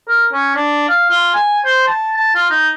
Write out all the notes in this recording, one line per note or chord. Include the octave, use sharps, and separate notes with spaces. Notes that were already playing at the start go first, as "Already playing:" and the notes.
A#4
C#4
D4
F5
F4
G#5
C5
A5
A5
F4
D#4